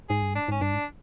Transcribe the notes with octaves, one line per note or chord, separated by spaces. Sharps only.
G#2 G#4
G2
G#2 D4
G#2 C#4
G2 D4
G#2